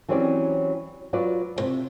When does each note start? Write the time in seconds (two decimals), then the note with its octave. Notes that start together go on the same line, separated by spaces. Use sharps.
0.09 E3 F#3 C4 C#4 G4 D5
1.13 F#3 F4 B4 D5
1.56 D2 C3